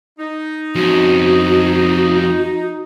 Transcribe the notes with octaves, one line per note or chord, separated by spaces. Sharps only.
D#4
F2 C#4 F#4